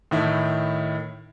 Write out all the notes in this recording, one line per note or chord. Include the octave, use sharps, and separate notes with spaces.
A2 D#3 E4